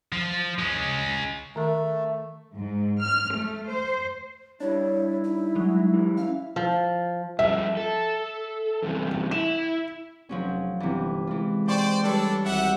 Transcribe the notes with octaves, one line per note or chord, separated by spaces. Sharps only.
F3
G#3 C#4
D#3 A3 A#4
G#2
F6
A3
C5
G2 D4 E4 C#5
D#4
F#3 G#3
E3 G3
C#4 E4 F5
F3
G2 F3 E5
A4
E2 G2 C3
E4 E7
F1 F3 F#3 C#4
G1 C3 E3
E3 G#3 F4
C5 D5 G5 C6 C#6
G3 D4 A4 B4 C#5
G#1 G4 E5 F#5